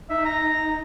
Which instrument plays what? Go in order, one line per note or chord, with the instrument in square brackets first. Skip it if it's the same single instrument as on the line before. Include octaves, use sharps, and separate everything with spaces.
[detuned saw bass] D#4 [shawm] E5
[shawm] A#5